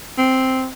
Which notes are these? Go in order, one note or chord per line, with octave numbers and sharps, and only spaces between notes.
C4